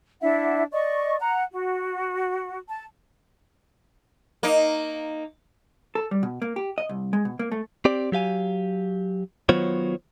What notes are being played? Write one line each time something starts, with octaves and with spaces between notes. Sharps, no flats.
D4 E4 E5 F#5
D5 D#5 C#6
F#5 A#5
F#4
A5
A#3 D#4
A4
G3
B2
A#3
G4
D#5
C2
G#3
B2
A#3
A3
C4 G4 D5
F#3 G4 F5 G#5
D#3 F#3 B3 F4 C5 C#5